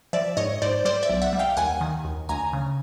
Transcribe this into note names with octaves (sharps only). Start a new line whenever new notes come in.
F3 D5 E5
G#2 C#5 D#5
G#2 C5 D5
G3 C5 D5
D5 E5
B1
E5 F#5
G3
F5 G5
D#2 F#5 G#5
D#3
D#2
D2 G#5 A#5
C#3